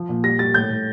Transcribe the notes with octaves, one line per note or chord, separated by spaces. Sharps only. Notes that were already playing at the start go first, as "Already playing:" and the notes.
Already playing: F3
A#2
G3 A#6
G3 A6
A2 G6
A2